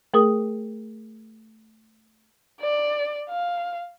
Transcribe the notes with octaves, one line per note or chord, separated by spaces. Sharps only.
A3 G#4 A#4 D#6
D5
F5